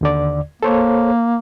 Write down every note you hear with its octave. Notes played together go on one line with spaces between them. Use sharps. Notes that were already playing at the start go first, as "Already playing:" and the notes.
D#2 D3 D5
A#3 A4 C5 C#5